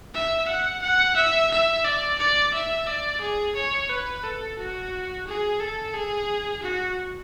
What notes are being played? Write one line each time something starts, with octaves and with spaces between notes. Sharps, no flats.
E5
F#5
F#5
E5
E5
D5
D5
E5
D5
G#4
C#5
B4
A4
F#4
G#4
A4
G#4
F#4